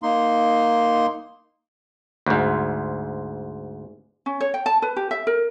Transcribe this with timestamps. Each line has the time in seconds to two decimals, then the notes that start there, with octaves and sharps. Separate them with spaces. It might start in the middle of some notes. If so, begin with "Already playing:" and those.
0.03 A#3 D#4 C6
2.26 D2 G#2
4.26 C#4
4.40 C#5
4.54 G5
4.66 A5
4.82 B4
4.96 G4
5.11 E5
5.27 A#4